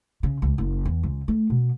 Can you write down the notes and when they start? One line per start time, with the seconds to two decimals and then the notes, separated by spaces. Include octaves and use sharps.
0.23 C#3
0.42 C#2
0.58 F#1
0.85 E2
1.03 C#2
1.28 A3
1.50 B2